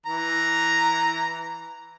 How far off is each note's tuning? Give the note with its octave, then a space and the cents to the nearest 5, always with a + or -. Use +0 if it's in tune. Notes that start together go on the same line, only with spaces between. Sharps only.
E3 +0 A#5 +0